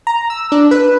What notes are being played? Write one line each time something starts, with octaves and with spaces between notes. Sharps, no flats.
A#5
E6
D4
B4